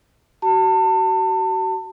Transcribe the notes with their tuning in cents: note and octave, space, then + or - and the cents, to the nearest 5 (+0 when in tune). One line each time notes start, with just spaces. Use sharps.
F#4 +40 A5 +30